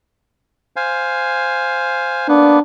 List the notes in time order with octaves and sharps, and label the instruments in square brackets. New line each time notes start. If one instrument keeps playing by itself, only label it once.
[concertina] C5 F5 G#5
[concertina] A#3 B3 B4 [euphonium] D4